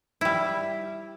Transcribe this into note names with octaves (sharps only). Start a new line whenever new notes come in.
G3 E4